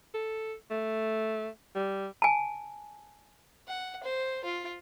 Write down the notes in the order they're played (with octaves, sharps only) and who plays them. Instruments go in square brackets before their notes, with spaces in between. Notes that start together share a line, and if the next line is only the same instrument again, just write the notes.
[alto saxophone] A4
A3
G3
[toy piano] G#5 A5
[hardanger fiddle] F#5
C5
F4